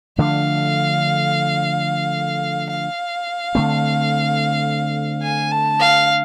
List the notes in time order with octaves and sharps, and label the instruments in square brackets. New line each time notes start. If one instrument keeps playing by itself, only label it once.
[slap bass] D3 F3 A3 D4 [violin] F5
[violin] F5
[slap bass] D3 A3 C4
[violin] G#5
A5
F5